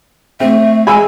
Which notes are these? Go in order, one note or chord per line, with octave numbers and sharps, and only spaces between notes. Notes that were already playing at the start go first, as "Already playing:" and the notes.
A3 C4 E5
G#3 G#4 G#5 B5 E6